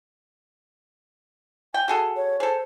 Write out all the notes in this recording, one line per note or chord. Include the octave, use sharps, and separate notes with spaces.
G5 G#5
F#4 G#4 A4
C#5
G#4 A4 C5